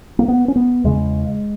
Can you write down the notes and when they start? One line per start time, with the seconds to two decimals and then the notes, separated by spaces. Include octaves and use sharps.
0.19 A#3
0.28 B3
0.48 C#4
0.56 B3
0.84 E2 C#3 G#3